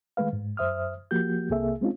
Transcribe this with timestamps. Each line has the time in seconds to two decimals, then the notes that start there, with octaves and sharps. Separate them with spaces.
0.17 D#3 G#3 A3 B4 F5
0.33 G#2
0.57 F#2 C5 E5 D#6 F6
1.11 F3 A#3 F#4 G4 G6
1.50 C2 C3 A#3 G#4 A4 E5
1.82 G#3 C4 C#4 D#4 F4